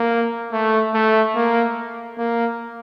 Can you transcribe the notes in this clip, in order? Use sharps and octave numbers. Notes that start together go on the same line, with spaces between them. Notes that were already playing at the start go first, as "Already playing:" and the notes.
Already playing: A#3
A3
A3
A#3
A#3